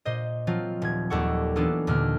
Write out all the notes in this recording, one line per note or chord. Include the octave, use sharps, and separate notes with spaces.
A#2 C5 D#5
F3 F#3 C4 F4
D#1 G#6
D#2 G3 A4 F#5 C#6
E3 F#3 B3 D4 F4 A4
D#2 A#2 D3 F6